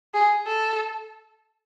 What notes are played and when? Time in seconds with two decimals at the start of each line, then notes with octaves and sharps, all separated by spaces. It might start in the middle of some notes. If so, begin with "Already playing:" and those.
0.14 G#4
0.47 A4